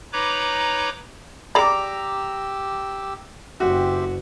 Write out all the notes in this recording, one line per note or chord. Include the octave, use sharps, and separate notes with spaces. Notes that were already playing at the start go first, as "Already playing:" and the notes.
D#4 B4 C#5 A#5 B5 D6
G4 G#4 D5 A#5 B5 D6 E6
F#1 C4 F#4 G4 E5